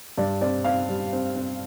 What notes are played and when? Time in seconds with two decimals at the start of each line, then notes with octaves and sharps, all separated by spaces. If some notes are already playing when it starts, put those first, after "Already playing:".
0.18 G2 D5
0.41 C4 D5
0.64 C4 F5
0.89 G3
1.13 C4
1.36 C4